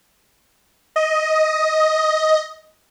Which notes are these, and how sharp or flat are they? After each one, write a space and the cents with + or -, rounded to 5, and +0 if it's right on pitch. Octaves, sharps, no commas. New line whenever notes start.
D#5 +10